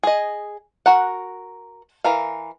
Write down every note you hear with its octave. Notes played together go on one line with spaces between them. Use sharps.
G#4 D#5
F#4 A#4 F#5
E3 A#4 F5